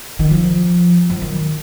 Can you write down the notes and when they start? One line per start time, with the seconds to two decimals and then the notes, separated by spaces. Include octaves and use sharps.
0.19 D#3
0.31 F3
1.10 F3
1.22 D#3